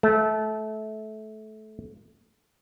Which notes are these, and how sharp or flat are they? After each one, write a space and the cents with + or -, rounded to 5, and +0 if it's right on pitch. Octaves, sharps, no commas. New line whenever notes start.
A3 -20